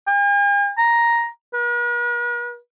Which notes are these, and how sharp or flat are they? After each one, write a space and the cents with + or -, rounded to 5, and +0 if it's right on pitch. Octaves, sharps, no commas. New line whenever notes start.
G#5 -45
A#5 +5
B4 -45